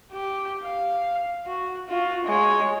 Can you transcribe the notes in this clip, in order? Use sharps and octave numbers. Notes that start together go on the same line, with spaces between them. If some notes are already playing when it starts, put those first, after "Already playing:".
G4
F5
F#4
F4 F#4
G#3 C#5